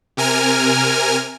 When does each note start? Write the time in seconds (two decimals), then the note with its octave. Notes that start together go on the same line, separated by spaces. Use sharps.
0.17 C3 A#4 G#5 F6